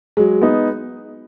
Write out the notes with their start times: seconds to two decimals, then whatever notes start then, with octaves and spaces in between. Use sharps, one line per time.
0.17 F#3 G#3
0.42 B3 D#4